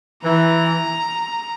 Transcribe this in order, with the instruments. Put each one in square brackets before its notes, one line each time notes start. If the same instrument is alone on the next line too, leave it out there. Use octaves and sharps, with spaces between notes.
[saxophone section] E3 [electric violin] A#5